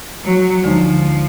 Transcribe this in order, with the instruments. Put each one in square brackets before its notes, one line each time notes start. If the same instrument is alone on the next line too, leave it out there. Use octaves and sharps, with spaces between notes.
[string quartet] F#3
[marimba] D2 D3 G#3 D#4 [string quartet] F3